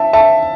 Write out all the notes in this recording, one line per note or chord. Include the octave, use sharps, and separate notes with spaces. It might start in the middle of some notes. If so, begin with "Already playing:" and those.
Already playing: E5 A5
E5 A5